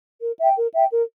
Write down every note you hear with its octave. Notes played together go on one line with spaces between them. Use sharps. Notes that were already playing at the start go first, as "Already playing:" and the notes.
A#4
E5 G5
A#4
E5 G5
A#4